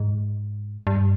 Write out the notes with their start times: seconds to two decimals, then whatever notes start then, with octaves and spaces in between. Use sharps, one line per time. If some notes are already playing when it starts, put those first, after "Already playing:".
Already playing: G#2
0.87 G2